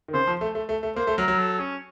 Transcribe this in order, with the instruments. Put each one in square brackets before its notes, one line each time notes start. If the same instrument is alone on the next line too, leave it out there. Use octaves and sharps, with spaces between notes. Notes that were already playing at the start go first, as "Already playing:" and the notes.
[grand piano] D#3
[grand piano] C#3 [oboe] C5
[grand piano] F3
A3
A3
A3
A3
[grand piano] A#3 [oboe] C5
[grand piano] A3
[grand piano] F#3 [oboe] A#4
[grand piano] F#3
[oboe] A4
C#4